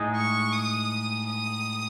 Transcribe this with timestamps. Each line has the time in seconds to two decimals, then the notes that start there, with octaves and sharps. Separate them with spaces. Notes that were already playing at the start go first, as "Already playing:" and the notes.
Already playing: A2 G#3 D#4 G#4
0.16 C#6
0.52 D#6
1.27 D#6